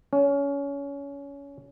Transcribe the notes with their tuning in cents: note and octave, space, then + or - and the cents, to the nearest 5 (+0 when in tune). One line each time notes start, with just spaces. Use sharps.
C#4 +25